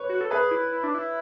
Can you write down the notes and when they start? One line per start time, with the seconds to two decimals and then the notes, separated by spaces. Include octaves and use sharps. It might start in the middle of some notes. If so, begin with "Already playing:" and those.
Already playing: B4 C#5
0.09 F#4
0.21 A4
0.30 G#4 B4
0.51 E4
0.72 E4
0.83 D4
0.94 E4